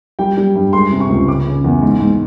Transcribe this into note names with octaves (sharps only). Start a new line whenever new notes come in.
G3 G5
G3
G2
G#3 C6
C3
C#6
C#2
C#3 D6
C#3
E2
G#2
G#2